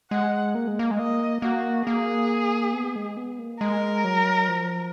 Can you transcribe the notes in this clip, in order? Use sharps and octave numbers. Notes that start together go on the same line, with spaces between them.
G#3 F#5
A#3
G#3
A#3
G#3
A#3 D#5
A#3 F#4
A#3 G#4
B3
G#3
B3
A#3
G#3 A#4
F#3
F3